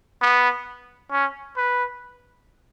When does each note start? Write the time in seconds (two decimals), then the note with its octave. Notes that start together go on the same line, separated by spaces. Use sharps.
0.22 B3
1.12 C#4
1.57 B4